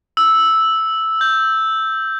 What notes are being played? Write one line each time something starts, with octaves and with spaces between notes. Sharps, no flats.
E6
G6